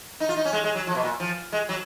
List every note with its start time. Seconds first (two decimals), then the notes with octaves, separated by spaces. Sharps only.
0.20 D#4
0.29 F4
0.36 D#4
0.45 C#4
0.53 G#3
0.64 G#3
0.75 F#3
0.87 F3
0.95 B2
1.03 A#2
1.20 F3
1.52 G#3
1.69 F#3